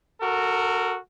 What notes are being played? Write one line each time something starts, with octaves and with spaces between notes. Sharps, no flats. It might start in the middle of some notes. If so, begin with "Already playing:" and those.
F#4 A4 A#4